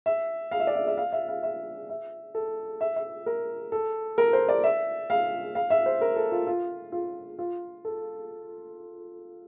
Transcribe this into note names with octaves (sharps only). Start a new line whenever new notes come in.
E5
F5
E5
D5
E5
E5
F5
E5
F5
E5
E5
A4
E5
E5
A#4
A4
A#4
C5
D5
E5
F5
F5
E5
C5
A#4
A4
F4
F4
F4
F4
A4